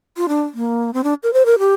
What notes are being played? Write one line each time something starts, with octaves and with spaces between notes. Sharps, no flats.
F4
D4
A#3
C4
D4
A#4
C5
A#4
G4